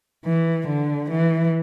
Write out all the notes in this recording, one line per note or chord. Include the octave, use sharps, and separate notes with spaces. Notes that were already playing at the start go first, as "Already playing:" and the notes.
E3
D3
E3